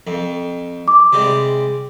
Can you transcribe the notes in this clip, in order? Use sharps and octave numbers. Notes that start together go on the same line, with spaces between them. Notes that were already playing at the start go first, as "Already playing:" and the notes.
F2
D6
C3 G3 G#3